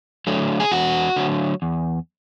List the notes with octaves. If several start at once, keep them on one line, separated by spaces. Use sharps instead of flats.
D3 F#3 A3
G#4
E2 F#4
D3 F#3 A3
E2